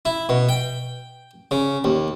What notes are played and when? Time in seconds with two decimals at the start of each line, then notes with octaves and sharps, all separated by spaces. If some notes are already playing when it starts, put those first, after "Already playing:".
0.05 E4
0.29 B2
0.49 G5
1.51 C#3
1.84 D#2